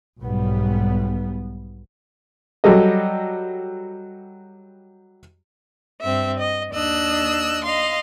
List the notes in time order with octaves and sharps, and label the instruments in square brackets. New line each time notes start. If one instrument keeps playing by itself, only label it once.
[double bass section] B1 G#2 G3 B3
[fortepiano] F#3 G3 A4 D#5
[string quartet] G2 C4 E5
D#5
D#2 D4 D#5 E6 F#6
D#5 F5 C6